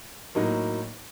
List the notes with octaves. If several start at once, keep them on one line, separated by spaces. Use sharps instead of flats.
A2 F#3 A#3 D#4